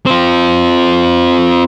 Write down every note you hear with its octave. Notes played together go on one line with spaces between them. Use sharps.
C4 F4